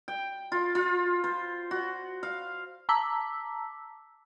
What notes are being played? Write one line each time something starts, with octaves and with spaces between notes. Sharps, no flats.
G5
F4
F4
C5
F#4
F5
A5 A#5 D6 E6 B6